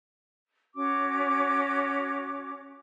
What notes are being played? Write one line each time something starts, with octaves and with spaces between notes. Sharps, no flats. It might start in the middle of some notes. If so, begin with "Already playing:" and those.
C#4 F#4 D6